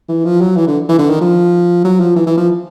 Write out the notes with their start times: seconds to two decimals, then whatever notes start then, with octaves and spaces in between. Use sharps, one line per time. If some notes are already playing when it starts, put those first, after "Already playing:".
0.09 E3
0.25 F3
0.41 F#3
0.56 E3
0.67 D3
0.89 E3
0.99 D3
1.10 D#3
1.21 F3
1.84 F#3
2.00 F3
2.16 E3
2.27 E3
2.37 F3